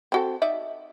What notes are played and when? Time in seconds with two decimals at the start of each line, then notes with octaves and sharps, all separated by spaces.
0.12 C4 F#4 A4
0.42 D#4 D5 E5